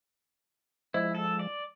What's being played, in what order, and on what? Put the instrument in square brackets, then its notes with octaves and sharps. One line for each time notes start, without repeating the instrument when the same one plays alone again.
[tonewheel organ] F3 G#3 [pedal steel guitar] E4
[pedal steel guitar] A4
D5